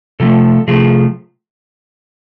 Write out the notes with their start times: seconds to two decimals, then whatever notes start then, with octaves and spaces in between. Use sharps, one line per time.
0.20 C3 F3 A3 A4
0.68 C3 F3 A3 G#4